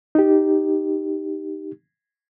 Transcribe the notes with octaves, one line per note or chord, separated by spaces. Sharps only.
D#4 G4